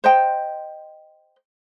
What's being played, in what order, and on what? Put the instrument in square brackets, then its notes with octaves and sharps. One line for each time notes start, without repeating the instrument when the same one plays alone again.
[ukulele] C5 D#5 G5